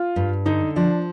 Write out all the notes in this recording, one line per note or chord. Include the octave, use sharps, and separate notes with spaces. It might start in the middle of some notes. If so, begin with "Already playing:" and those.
Already playing: F4
G2
D3 D#4
F3 D4